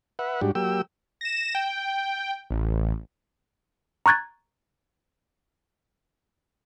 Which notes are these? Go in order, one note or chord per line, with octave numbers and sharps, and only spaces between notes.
B4 E5 F#5
G#2 G3 D4 F#4 G4
F#3 A#3 G4 G5 E6
A#6 E7
G5
A1
A#5 C#6 F#6 G#6 A6